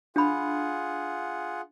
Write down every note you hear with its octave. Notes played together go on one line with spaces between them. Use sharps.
D4 F4 G#4 F#5 B5